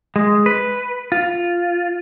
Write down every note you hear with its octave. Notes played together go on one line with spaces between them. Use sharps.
G#3
B4
F4